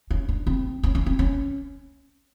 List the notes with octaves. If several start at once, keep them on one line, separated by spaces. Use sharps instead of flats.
C#4
D4
C4
C#4
C#4
C4
C#4